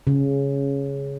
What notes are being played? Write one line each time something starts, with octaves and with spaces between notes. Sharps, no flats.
C#3